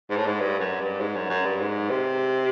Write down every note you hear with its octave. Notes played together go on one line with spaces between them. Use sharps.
G#2
A2
G#2
G2
F#2
G2
G#2
F#2
F#2
G2
G#2
C3